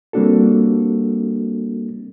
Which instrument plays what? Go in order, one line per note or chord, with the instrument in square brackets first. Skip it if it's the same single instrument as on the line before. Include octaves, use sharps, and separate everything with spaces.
[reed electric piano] G3 A#3 C4 D4 F#4 A4